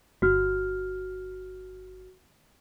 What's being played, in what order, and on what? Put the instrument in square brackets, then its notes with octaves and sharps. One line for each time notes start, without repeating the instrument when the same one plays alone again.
[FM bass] G1 [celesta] F#4 F6